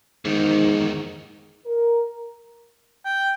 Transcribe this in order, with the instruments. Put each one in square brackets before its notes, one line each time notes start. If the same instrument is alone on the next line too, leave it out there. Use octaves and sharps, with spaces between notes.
[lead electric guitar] E2 D#3 [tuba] G#2
[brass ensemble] A#4
[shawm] G5